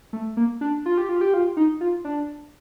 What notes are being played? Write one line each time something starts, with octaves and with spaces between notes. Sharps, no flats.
A3
A#3
D4
F4
G4
F4
G4
F4
D#4
F4
D4